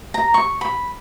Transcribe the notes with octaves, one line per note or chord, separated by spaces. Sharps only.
A#5
C#6
B5